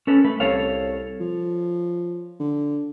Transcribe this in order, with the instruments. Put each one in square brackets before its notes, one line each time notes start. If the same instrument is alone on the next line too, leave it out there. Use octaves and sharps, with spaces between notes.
[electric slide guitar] C#4 A4 B4
A3 B4
[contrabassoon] C2 [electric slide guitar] A4 C#5 F5
[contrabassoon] F3
D3